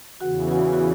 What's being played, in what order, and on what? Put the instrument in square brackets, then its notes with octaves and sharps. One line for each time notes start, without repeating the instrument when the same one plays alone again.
[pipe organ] E2 C#3 E3 [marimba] F#4 F#5
[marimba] F#4 F#5
F#4